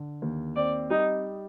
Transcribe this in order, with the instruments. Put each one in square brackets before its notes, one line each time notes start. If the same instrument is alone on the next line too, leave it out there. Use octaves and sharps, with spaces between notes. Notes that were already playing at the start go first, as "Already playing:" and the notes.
Already playing: [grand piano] D3
D#2
[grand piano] C4 [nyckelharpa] D5
[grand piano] G3 [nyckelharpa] D#4